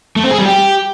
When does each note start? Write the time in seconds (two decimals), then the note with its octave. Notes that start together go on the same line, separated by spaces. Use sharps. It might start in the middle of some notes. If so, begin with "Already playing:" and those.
0.16 A3
0.24 C4
0.31 G#4
0.38 G3
0.46 G4